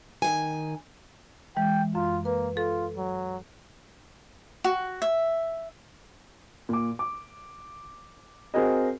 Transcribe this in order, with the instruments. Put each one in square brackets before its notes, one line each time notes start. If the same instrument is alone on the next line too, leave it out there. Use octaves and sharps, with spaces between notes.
[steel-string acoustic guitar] D#3 G#5
[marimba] E3 G#3 [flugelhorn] G5
[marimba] F#2 [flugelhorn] F4
[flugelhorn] A#3 [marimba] B4
[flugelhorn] F4 [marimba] A4
[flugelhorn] F#3
[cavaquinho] F#4
E5
[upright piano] A#2 D6
D6
C4 F#4 G#4 A#4 D#5